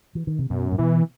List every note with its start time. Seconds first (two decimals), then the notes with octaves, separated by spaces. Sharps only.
0.15 E3
0.27 D#3
0.39 C3
0.50 F#2 B2
0.72 A2
0.78 B2 E3